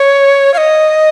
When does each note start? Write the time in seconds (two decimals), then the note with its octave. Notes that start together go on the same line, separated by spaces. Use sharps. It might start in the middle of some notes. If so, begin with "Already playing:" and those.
Already playing: C#5
0.54 F5
0.58 D#5